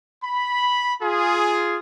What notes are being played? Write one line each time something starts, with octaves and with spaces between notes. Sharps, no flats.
B5
F4 G#4